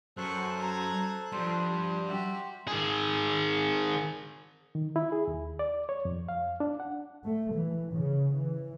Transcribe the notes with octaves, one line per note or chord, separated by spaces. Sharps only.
F#2 A4 C5 C#6 F#6
A#5 G#6
F3 G3 D4 C6
F#4 G4 E5 A5
D#3 G#4
D#3
E4
G#4
D#2
D5
C#5
F2
F5
D4
F#5
A3
E3
C#3
E3